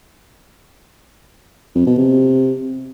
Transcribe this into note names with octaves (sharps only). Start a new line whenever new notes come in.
F2
B2
C3